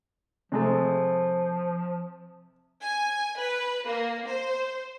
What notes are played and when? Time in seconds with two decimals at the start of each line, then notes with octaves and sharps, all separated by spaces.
0.52 C3 F3 G#3 A3
2.83 G#5
3.38 B4
3.86 A#3
4.26 C5